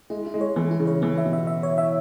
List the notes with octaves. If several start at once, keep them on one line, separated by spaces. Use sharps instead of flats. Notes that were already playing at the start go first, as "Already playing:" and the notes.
G#3 E4
E4
G#3
C#5
E3 B3
E4
C#3
C#5
E3 B3
E5
B2
E5
E5
C#5
E5